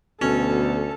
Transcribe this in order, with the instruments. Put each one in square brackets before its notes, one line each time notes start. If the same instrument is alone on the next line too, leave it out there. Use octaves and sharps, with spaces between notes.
[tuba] D2 [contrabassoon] B2 [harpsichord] C#4 [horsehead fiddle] A4